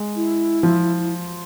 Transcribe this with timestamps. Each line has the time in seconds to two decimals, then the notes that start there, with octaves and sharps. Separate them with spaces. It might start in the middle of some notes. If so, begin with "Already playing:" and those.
Already playing: G#3
0.16 E4
0.63 F3